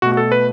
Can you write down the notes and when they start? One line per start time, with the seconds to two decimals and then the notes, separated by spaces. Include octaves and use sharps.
0.02 B2 A3 F#4
0.12 F#4
0.17 A4
0.32 B4